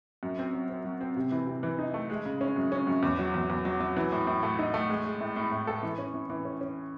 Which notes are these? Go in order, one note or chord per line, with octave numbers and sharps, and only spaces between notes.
F#2
C4
F#3
C4
F#3
C4
C3
E3
C3
E3
D#4
A3
G#3
C#3
C#4
F#2
C#4
F#2
E2
F#3
E2
E2
F#3
F#3
E3
A2
A2
A3
D#4
A3
G#3
G#3
A2
A2
A2
A4
E3
C#4
E3
E3
C#4
C#4